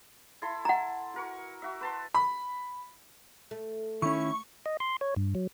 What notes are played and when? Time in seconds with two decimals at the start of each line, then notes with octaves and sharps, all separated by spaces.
0.42 E4 A4 C6
0.65 F#5 A#5
1.14 F#4 A#4 C#6
1.62 F#4 E5
1.81 B4 A5 C6
2.14 B5
3.51 A3
4.02 D#3 C#4 E4 C#6
4.66 D#5
4.80 C6
5.01 C#5
5.16 G2
5.35 F#3